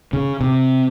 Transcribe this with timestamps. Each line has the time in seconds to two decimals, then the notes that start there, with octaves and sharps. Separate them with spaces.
0.13 C#3
0.41 C3